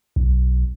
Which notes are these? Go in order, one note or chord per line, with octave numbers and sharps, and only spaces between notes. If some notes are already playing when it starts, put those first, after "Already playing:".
B1